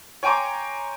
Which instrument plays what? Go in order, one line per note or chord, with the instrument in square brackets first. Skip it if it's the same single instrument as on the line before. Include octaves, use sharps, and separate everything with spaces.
[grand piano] C#5 G5 G#5 A#5 C6 D6